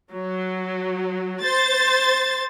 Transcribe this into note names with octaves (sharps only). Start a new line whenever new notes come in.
F#3
C5 A6